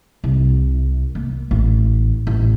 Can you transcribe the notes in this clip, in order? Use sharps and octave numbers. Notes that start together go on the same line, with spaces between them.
C2
A#3
A1
A1